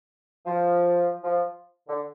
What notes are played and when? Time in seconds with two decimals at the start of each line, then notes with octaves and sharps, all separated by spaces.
0.46 F3
1.23 F3
1.88 D3